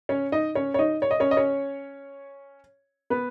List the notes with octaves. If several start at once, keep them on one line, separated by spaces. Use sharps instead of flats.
C#4 C#5
D#4 D#5
C#4 C#5
C#5
D#4 D#5
C#5
D#5
C#4 C#5
D#5
C#4 C#5
B3 B4